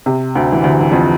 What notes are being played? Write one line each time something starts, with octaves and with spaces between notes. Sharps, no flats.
C3
D2 D3
E3
D2 D3
E3
F2 F3